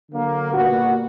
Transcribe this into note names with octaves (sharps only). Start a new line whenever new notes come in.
D3 F#3 A#3
A#2 G3 B3 F#4